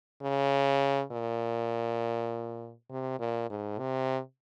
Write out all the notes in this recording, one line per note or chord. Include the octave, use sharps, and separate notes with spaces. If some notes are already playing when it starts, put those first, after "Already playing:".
C#3
A#2
C3
A#2
G#2
C3